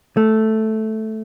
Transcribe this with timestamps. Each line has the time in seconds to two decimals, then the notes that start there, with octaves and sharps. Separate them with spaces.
0.17 A3